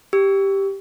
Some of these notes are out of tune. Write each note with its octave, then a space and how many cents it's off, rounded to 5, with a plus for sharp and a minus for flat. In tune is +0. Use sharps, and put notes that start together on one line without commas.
G4 +0 E6 +0